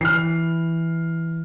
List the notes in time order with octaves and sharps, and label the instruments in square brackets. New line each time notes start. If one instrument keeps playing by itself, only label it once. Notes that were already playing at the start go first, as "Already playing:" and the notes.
[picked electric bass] E3 [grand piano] F6 C7